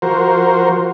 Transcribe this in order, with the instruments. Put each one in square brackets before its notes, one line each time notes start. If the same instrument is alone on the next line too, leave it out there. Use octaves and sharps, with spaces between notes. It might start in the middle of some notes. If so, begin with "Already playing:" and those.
[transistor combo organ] F3 F#4 A#4 C5